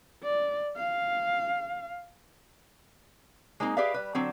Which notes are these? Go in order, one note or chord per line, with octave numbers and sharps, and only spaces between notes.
D5
F5
G#3 A#3 C4 D#4 A#5
G4 G#4 B4 D5 E5 F5
G3 B4
D3 F#3 C4